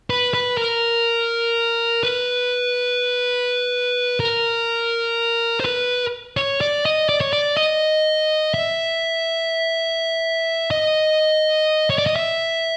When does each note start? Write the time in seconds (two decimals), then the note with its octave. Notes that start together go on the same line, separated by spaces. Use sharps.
0.10 B4
0.34 B4
0.58 A#4
2.03 B4
4.20 A#4
5.60 C5
5.65 B4
6.37 C#5
6.61 D5
6.85 D#5
7.09 D5
7.21 C#5
7.33 D5
7.57 D#5
8.54 E5
10.71 D#5
11.90 C#5
11.98 D5
12.06 D#5
12.16 E5